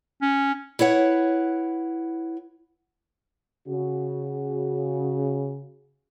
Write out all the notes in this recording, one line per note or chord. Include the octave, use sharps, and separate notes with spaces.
C#4
E4 B4 C#5 F#5
C#3 F#4